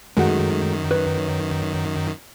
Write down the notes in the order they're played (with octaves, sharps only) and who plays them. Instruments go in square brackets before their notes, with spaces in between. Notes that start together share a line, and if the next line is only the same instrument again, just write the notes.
[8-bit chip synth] F#2 D#3 [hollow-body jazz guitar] G#3 A3 F#4
[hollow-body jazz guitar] B4 C#5